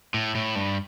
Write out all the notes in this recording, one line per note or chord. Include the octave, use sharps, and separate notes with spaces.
A2
A2
G2